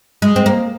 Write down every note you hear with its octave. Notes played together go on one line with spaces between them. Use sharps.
G#3
C4
A#3